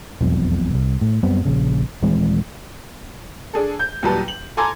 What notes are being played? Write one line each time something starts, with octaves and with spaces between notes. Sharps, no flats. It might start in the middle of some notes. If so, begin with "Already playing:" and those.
E1 B1 F2
C2
A2
F#2 G3 B3 C4
A#1 C#3
D#1 E3 G#3 C4
D4 G#4 A4
G6
D#2 A#2 F#3 G3 B4 A5
F#7
A4 G#5 A#5 C6 D6 G#6